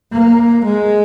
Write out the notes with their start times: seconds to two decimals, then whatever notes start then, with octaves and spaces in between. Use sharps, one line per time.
0.12 A#3
0.64 G#3